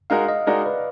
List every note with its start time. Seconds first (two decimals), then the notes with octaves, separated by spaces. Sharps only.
0.10 G#3 D#4 F#4 A#4 F5
0.29 D#5
0.47 G#3 D#4 F#4 A#4 D5
0.66 B4